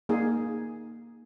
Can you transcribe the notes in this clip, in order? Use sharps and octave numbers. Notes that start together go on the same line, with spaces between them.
A#3 D#4 G#4